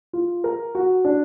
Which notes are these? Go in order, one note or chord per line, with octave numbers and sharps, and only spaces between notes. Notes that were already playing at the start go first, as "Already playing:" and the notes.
F4
A#4
F#4
D4